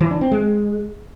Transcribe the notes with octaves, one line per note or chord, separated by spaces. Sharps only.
E3
D4
C4
G#3